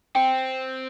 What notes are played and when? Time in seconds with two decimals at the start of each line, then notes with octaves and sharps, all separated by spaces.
0.15 C4 G5